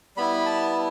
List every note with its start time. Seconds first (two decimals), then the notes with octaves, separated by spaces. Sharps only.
0.17 G3 B3 E4 B5
0.46 A5